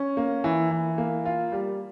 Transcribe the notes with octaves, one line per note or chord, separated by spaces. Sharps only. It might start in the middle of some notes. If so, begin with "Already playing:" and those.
Already playing: C#4
A#3
E3
E3
A#3
F4
G3